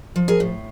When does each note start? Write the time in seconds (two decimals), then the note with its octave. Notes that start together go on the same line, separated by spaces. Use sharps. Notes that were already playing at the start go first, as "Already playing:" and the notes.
0.16 F3
0.28 G#4 A#4
0.40 A2